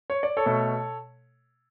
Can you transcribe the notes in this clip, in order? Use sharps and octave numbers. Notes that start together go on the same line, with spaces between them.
C#5
D5
A4 C#5
B2 A3